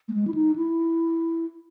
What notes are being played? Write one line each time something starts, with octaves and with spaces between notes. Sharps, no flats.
A3
G#3
E4
D#4
E4